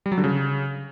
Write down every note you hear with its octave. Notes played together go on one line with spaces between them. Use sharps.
G3
F#3
D3
C#3